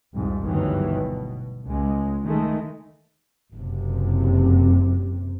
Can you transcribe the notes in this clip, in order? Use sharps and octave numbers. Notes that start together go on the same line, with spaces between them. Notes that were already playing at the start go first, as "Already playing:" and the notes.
C2 F2 G#2
G1 D2 G2 D#3 E3 F#3
B2
C#2 G#3
D#3 G#3 A3
F#1 C3